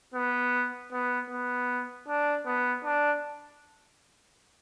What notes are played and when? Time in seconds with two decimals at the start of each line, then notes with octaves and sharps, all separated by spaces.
0.14 B3
0.92 B3
1.30 B3
2.08 D4
2.46 B3
2.85 D4